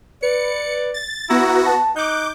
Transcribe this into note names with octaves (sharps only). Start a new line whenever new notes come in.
B4 D5 C#7
A6
B3 E4 F#4 A#5 A#6
A5
D#4 D6 F#6 G6